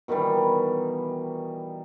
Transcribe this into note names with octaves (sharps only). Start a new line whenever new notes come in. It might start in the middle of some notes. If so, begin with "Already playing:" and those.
B2 D#3 E3 G3